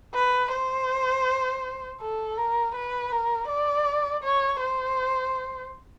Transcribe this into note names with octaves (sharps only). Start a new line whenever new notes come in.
B4
C5
A4
A#4
B4
A#4
D5
C#5
C5